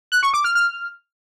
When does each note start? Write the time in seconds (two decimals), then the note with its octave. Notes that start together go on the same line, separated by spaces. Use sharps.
0.12 F#6
0.23 C#6
0.34 D6
0.44 F6
0.55 F6